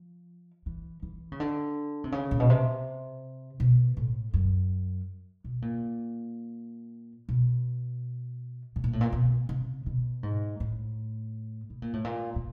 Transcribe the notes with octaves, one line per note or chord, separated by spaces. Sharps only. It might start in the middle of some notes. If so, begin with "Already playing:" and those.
Already playing: F3
E3
E3
C#3
D3
C3
C#3
A#2
B2
C3
B2
A2
F#2
B2
A#2
B2
B2
A#2
A2
A#2
B2
C3
B2
G#2
A2
B2
A#2
A2
A#2
A#2